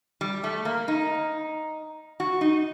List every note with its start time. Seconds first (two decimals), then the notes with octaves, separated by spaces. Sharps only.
0.21 G3
0.44 A3
0.65 A#3
0.88 D#4
2.20 F#4
2.41 D#4